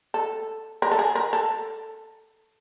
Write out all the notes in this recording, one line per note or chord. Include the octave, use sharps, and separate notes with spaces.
A4
A#4
A4
G#4
A#4
A4